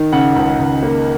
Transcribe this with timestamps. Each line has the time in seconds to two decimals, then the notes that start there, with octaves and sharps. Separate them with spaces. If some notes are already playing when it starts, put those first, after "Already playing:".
Already playing: D#3
0.13 C#3 F#5
0.36 C#2
0.59 C#2
0.83 A#3